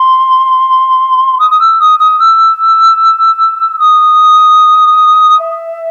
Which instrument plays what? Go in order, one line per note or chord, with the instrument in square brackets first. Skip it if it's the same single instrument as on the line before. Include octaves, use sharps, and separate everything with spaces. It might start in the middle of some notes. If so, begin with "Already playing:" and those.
Already playing: [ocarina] C6
D#6
D#6
E6
D#6
D#6
E6
D#6
E5